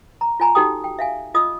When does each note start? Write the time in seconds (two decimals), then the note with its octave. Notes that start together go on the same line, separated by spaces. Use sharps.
0.21 A#5
0.40 F4 C#5 G#5 A#5
0.55 D#4 F#4 G4 A4 G5 D#6
0.84 G5
0.99 E5 F5 G#5
1.34 F4 D#5 D#6 E6